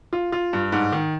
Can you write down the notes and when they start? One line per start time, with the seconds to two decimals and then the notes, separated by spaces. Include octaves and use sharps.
0.13 F4
0.32 F4
0.53 G2
0.72 G#2
0.92 D#3